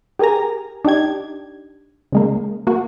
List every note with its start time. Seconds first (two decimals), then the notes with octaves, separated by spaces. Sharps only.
0.19 G4 G#4 A#4 G#5 A#5
0.85 D4 D#4 G4 G#6
2.12 C#3 G#3 A#3
2.67 A#3 F#4